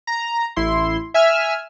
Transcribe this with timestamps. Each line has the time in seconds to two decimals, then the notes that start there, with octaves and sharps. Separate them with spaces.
0.07 A#5
0.56 A1 E4 C6
1.14 E5 G#5 E6 F6